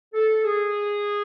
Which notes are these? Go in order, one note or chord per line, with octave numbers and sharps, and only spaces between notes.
A4
G#4